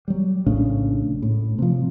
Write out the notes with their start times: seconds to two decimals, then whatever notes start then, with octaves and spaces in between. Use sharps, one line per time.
0.08 F#3 G3
0.46 A#1 A2 C#3 D4
1.22 A2
1.58 C3 F3